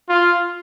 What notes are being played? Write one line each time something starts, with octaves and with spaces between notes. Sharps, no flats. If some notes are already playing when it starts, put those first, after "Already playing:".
F4